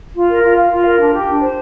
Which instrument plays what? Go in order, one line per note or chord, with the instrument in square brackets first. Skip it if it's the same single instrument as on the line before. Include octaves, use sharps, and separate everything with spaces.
[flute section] F4
A#4
F4
F5
F4
A#4
D4
G4
D4
C5